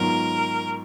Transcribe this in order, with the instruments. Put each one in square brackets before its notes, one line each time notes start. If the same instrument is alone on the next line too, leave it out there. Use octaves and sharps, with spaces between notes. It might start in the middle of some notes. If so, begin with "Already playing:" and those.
Already playing: [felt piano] G#2 D#3 F#3 B3 F4 [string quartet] A#4